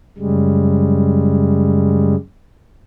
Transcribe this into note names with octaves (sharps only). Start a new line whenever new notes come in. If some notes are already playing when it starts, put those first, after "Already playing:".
F#2 C#3 G3 G#3